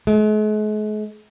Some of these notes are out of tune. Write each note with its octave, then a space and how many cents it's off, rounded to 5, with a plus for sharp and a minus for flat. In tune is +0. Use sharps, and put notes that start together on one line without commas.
G#3 +45